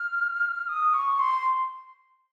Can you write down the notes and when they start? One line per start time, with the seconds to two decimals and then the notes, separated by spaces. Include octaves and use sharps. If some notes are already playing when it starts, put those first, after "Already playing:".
Already playing: F6
0.69 D#6
0.94 C#6
1.19 C6